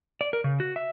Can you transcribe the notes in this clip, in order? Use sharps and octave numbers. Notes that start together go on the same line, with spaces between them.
D5
A#4
C#3
F#4
E5